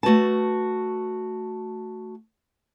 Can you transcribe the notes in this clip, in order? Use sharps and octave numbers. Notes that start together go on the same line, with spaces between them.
A3 F#4 B4 A5